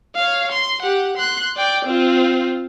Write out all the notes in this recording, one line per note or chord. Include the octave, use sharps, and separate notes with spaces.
C#5 F5
C6
G4 F#5
C6 F#6
D5 G5
C4 F4